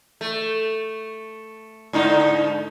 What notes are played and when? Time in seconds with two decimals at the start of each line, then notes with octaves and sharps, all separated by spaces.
0.21 A3
1.93 G#2 D3 D#4